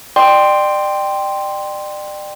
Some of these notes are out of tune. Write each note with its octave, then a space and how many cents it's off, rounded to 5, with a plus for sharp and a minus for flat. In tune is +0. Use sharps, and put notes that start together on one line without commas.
D5 +35 G5 +0 C6 +0